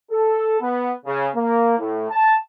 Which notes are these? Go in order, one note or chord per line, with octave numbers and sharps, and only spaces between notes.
A4
B3
C#3
A#3
A2
A5